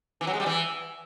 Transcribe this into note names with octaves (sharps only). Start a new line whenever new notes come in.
E3
F#3
G#3
G3
E3